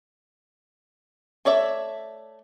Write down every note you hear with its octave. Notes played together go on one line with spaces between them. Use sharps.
A3 C#5 D5 E5